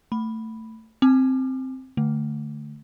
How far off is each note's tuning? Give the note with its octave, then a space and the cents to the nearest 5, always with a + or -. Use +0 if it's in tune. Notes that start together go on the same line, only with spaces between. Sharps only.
A3 +20 B5 +0
C4 +0 G#5 +0 D6 +30
D3 +0 A3 +0